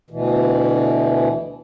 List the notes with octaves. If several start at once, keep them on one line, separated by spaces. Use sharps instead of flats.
D2 B2 E3